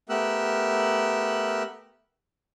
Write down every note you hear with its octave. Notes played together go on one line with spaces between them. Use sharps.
A3 B3 G4 A#4 E6 F#6